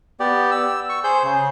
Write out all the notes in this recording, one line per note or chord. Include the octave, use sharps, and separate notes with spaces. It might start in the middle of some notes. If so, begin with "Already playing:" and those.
B3 G4 D5
E6
C#6
G#4 C5 G6
C#3